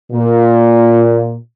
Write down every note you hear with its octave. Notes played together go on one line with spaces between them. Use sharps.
A#2